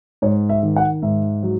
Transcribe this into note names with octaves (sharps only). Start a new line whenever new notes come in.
G#2 C#5
E5
D#3
F#5
G#2 E5
F#3